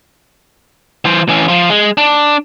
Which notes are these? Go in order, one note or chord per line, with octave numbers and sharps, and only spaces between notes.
E3 C5
E3 C#4
F3 F4
G#3
D4